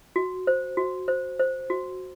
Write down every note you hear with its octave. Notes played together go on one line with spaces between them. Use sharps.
F#4
C5
F#4
C5
C5
F#4